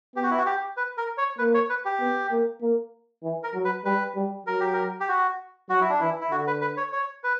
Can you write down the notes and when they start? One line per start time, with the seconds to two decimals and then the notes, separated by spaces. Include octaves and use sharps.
0.16 B3 G4
0.23 F#4
0.31 E4
0.38 F#4
0.46 G4
0.77 B4
0.98 A#4
1.18 C#5
1.38 A#3 B4
1.54 C#5
1.70 B4
1.85 G4
2.00 B3
2.31 A#3
2.62 A#3
3.23 E3
3.43 A#4
3.55 F#3
3.65 B4
3.85 G3 B4
4.16 G3
4.47 F#3 A#4
4.60 G4
4.73 A#4
5.00 G4
5.09 F#4
5.69 F#3 F#4
5.81 E4
5.90 D4
6.01 E3 E4
6.21 E4
6.31 D3 F#4
6.47 B4
6.61 B4
6.77 C#5
6.92 C#5
7.24 B4